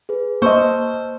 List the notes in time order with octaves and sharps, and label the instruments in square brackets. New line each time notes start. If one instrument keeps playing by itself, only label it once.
[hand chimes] G#4 B4
[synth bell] A#3 [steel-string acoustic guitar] C5 [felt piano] D#5 C#6 [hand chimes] A5 E6 F6